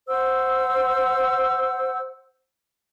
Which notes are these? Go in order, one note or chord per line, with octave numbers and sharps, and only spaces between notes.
C5 F#5 E6